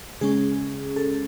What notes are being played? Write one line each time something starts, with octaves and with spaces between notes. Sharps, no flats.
C#3 G#3 C#4 G#4
A4